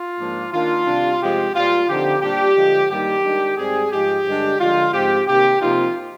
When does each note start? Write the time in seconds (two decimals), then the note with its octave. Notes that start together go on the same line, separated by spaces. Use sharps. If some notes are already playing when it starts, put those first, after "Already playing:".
Already playing: F4
0.19 G#2 F3 A#3 D4
0.53 D#3 A#3 D4 F4
0.86 C3 G3 D4
1.20 C3 F3 G#3 G4
1.55 A#2 G3 A#3 F4
1.89 D3 F3 C4 D#4 G4
2.22 A#2 G3 D4 G4
2.56 D3 F3 G#3
2.90 G2 D#3 G3 A#3 D#4 G4
3.24 D#3 G#3 D4
3.57 G#2 G3 C4 G#4
3.92 G#2 F3 G#3 G4
4.26 G2 D3 G#3 D4
4.60 D3 F3 G#3 F4
4.93 G#2 F3 C4 G4
5.27 C3 D#3 A#3 G4
5.61 C3 F3 A#3 D#4 F4